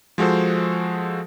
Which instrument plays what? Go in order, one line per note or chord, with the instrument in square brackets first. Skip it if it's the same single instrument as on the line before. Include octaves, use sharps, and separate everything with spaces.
[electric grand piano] F3 G#3 F#4 A4 C5